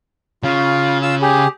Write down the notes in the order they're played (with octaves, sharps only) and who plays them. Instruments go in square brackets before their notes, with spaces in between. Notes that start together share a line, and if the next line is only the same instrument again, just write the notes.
[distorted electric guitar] C#3 [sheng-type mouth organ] F4
[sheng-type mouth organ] F4 E6
G4 G#4